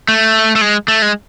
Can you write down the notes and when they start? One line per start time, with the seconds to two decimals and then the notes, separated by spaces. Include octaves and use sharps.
0.08 A3
0.55 A3
0.61 G#3
0.88 A3
1.02 G#3